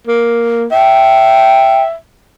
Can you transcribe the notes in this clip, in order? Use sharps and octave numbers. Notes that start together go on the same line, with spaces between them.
A#3
E5 G5